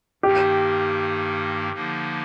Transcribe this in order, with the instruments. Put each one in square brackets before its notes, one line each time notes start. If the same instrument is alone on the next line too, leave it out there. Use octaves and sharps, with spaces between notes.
[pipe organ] G2 D#3 A#3 D#4 [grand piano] G4
[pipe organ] D3 F3 A#3 D#4